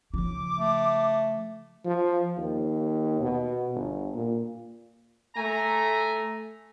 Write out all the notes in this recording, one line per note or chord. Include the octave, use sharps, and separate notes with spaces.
C#3 F3 D6
A3
F3
D#2
B2
G1
A#2
A3 G#5 A#5